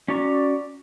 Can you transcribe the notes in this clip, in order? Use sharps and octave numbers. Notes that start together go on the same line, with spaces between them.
C#4 F#4 D5 A#5 C#6